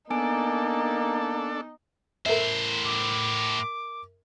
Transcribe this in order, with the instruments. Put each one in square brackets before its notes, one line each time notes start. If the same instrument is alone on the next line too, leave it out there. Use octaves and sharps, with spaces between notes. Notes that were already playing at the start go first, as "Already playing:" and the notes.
[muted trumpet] A#3 [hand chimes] B3 G#5 D7 [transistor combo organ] D4 A4 [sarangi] D#4
[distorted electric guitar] A2 C5 [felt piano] A#4 E5
[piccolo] D6